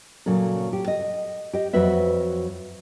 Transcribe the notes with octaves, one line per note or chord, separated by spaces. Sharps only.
A#2 C#3 F#3 A4
G4
D#5
G4 D#5
F2 F#3 F#4 B4 E5